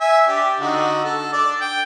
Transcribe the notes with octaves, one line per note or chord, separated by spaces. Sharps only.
E5 G#5
D4 G4
D3 D#4 F#4
A4
D4 D5
G5